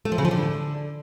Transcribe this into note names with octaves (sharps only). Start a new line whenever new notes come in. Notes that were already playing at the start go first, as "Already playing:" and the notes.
A3
F3
C#3
F3
D3